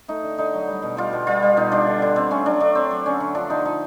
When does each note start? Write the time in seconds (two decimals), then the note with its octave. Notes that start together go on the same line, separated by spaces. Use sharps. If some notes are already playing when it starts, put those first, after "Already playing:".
0.08 A3 D#4
0.23 D3
0.38 D3 D#4
0.54 F#3
0.67 G3
0.82 B2
0.97 G3 F4
1.13 B2
1.27 G3 F4
1.42 G3
1.57 B2 D#4
1.72 G3 D4
1.87 D3
2.02 D3
2.16 D3 C4
2.31 A3 C#4
2.46 F#3 D4
2.60 A3 D4
2.75 F#3 C4
2.91 F#3
3.06 D3 C#4
3.20 D3
3.35 F3 D4
3.50 D3 D#4
3.65 F3 D#4